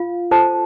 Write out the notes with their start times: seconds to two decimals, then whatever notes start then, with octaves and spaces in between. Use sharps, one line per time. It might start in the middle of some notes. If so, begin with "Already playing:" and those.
Already playing: F4 F5
0.31 F4 A4 C5 A5